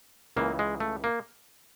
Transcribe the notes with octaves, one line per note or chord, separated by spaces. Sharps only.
C#2 C#3 E3 A#3
G#3
A3
A#3